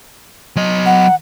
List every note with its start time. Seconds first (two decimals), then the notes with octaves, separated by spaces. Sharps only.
0.56 F#3 D#5
0.86 F#5